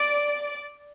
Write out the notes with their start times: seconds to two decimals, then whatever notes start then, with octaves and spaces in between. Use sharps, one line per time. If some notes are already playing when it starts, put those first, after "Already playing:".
Already playing: D5